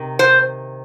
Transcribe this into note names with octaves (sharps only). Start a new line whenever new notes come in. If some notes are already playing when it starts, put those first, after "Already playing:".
Already playing: C3 D#3
C5